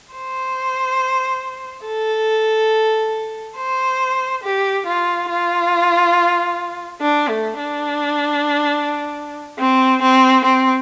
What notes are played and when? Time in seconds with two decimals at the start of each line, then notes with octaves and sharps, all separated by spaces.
0.14 C5
1.86 A4
3.57 C5
4.43 G4
4.86 F4
5.30 F4
7.01 D4
7.29 A3
7.58 D4
9.59 C4
10.02 C4
10.44 C4